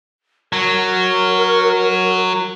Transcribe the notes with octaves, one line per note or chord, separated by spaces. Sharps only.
F#3 A#4